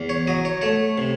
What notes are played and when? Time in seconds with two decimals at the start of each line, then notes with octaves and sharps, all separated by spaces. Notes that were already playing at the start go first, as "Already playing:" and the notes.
Already playing: E2
0.09 C#5
0.27 F#3 D#5
0.45 C#5
0.61 A3 C#5
0.98 C3